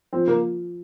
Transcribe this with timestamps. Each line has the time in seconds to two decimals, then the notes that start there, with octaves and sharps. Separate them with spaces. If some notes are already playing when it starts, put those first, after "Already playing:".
0.13 F3 C4
0.28 A#3